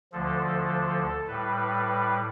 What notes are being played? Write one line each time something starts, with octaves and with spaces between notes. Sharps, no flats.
D2 D3 F3 A4
A2 G3 B4
B4
B4